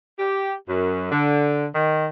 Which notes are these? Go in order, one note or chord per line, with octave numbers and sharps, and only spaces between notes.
G4
F#2
D3
D#3